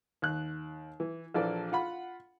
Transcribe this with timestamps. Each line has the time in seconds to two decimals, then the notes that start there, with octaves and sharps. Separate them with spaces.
0.22 D#2 F#6
1.00 E3
1.34 A#1 E3 F3 A4 D5
1.72 F4 F#5 B5